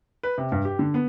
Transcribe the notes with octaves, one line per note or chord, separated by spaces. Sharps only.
B4
C3
G2
G4
D3
B3